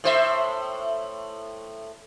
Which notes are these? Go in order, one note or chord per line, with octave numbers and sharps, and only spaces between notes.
A2 C5 E5